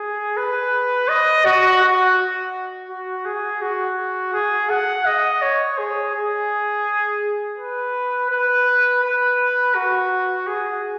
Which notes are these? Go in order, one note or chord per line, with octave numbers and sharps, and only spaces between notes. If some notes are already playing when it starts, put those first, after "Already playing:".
Already playing: G#4
B4
D#5
F#4
F#4
F#4
G#4
F#4
G#4
F#5
D#5
C#5
G#4
G#4
B4
B4
B4
F#4
G#4